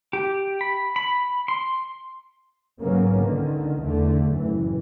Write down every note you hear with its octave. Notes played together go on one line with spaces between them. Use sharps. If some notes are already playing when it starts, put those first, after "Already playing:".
G4
B5
B5
C6
G#2 C#3 F#3 A#3 B3 C#4
C#2 D3 D#3
E2 D3 A3
F#1 A2 E3